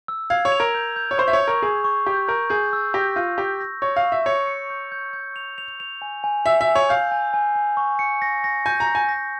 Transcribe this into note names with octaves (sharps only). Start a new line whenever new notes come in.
E6
F5 G#6
C#5
F7
A#4
G6
G6
C#5
C5 C#6
E5
C#5
C#6
A#4
G#4 C#6
C#6
G4 G6
A#4 G6
G#4 G6
E6
G4 A#6
F4 G6
G4 E6
A#6
C#5 C#6
F5
E6
E5
C#5 C#7
C#7
G6
G6
G6
F7
F7
F7
G#5
G#5
E5 E6
E5
G#5
C#5
F5 G6
G#5
G#5
G#5
C#6
C#7
A#6
A#6
G#5 G6
A#5
A#6
G#5
A#6